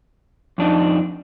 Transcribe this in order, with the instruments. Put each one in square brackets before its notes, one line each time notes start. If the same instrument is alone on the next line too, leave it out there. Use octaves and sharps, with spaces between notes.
[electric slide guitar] F2 D4 D#4